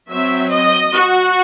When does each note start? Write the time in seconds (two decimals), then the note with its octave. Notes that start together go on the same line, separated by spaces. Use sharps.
0.10 F#3 C4 E5
0.52 D#5
0.93 F#4